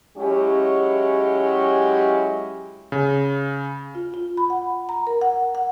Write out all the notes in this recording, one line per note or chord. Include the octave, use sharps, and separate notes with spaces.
F#3 G#3 C#4 E4 G4
C#3
F4
F4
B5
F#5
A#5
A#4
F#5
F#5